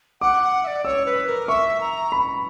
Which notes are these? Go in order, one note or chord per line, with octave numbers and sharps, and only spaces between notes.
F#5 D6
F#5
E5
D5
C#5 E6
B4
A#4
E5 C#6
A#5
B5